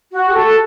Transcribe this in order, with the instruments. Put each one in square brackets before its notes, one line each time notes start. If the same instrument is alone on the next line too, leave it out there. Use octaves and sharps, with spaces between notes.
[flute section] F#4
G4
A4